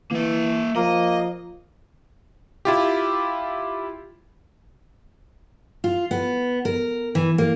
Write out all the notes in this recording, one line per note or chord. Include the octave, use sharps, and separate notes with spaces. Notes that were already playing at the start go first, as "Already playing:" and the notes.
E3 A#3 E5
F3 A#3 D#5
E4 F4 G4
F4
B3
A#4
E3
A#3